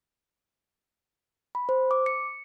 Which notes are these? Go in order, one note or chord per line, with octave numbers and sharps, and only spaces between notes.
B5
C5
D6
C#7